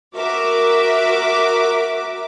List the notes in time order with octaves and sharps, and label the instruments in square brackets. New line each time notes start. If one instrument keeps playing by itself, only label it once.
[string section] F#4 A#4 E5 D6